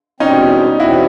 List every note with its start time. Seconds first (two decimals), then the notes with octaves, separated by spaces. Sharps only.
0.20 E2 B2 G3 C4 C#4 D#4
0.80 E2 B2 G3 C4 E4 F#4